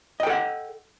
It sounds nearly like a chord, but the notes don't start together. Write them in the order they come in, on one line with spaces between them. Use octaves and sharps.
D#5 G5 A4 F#5